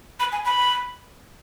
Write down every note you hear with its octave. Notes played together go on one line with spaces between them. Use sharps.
B5
G#5
B5